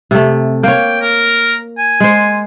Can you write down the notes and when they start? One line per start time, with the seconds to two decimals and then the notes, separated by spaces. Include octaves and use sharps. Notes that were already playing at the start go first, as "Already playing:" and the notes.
0.11 C3 A3
0.63 A#3 C#5 G5
1.02 A#4
1.78 G#5
2.00 G#3 C5